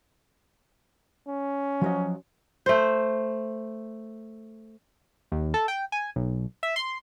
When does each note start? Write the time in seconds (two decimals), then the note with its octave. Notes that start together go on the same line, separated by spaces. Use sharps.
1.28 C#4
1.82 F3 F#3 D#5
2.66 A3 C5
5.32 D#2
5.54 A4
5.68 G5
5.92 G#5
6.16 B1
6.63 E5
6.76 C6